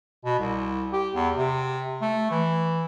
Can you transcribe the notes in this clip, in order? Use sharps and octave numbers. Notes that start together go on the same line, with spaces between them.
B2
C2
G4
E2
C3
A3
E3